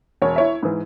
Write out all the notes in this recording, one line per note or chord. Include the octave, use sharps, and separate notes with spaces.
E1 C#5
E4 C#5 E5
G#2 E3